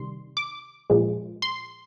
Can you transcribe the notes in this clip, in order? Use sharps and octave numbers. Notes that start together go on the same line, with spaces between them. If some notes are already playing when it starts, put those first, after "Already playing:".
Already playing: C3 D#3 G3 C6
D6
A#2 F3 G#3
C6